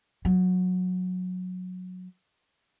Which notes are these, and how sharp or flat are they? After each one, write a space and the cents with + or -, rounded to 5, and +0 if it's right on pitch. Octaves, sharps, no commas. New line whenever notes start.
F#3 -20